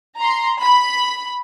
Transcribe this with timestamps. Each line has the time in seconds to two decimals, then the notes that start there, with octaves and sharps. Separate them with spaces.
0.18 A#5 C6
0.62 B5